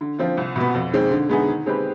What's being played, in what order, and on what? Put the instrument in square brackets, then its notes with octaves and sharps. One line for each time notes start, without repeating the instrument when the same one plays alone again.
[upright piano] D3
F3 C4 F4
C2
B2 B3
F2
D#3 G#3 C4
D3
G#3 B3 D#4 G#4
D#3
G#3 C4 G4 B4